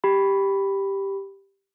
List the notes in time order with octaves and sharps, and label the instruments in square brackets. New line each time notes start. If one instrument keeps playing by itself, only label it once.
[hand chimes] G4 B5